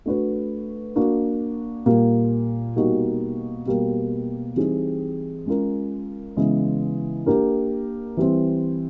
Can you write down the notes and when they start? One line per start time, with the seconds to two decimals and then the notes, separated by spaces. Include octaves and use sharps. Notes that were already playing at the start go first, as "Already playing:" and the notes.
0.06 A3 D4 F#4 B4
0.96 A#3 D4 F#4
1.86 A#2 G3 A#3
2.76 B2 G3 A#3 D#4 F#4
3.66 B2 G3 A#3
4.56 E3 G3 C4 D#4 G#4
5.46 G#3 C#4 F4 A#4
6.36 C#3 E3 G#3 B3 E4
7.26 A#3 D4 G4 A#4
8.17 E3 G3 C4